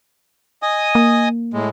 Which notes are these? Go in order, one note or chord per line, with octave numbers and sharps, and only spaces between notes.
D#5 G#5 D#6
A#3
A2 G#3